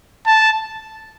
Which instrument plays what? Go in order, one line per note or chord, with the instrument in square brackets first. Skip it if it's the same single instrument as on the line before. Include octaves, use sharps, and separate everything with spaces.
[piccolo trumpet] A5